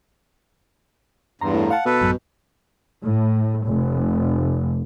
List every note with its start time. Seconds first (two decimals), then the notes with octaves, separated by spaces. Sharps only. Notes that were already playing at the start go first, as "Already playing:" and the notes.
1.41 E2 G2 A#5 C6
1.53 A2
1.70 F5 F#5 A5
1.86 B2 A4 B4
2.01 A1 F#2
3.02 A2
3.65 F1